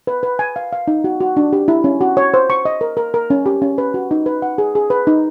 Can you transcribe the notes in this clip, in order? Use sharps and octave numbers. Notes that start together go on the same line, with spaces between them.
B4
B4
G#5
F5
F5
D#4
F#4
F#4
D4
G4
E4
C#4
F#4
C#5
C5
C#6
D#5
A#4
A#4
A#4
C#4
G4
C#4
B4
F#4
D#4
B4
F#5
G#4
G#4
B4
D#4